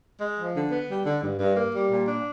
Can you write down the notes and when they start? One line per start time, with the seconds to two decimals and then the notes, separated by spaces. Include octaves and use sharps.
0.21 G#3
0.39 F3
0.56 D3
0.71 B3
0.88 G3
1.06 D3
1.23 G2
1.39 G2
1.56 A#3
1.73 G3
1.91 A#2
2.07 D4